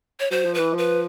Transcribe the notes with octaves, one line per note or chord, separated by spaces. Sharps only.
C#5
F#3 C5
F3
E3 B4
F3
B4